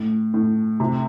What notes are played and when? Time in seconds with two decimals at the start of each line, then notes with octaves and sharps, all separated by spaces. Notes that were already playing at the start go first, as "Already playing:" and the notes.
Already playing: A2
0.34 A2
0.80 C3